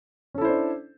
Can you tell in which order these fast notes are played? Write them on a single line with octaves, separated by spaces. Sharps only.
C#4 A4 E4 C5 D4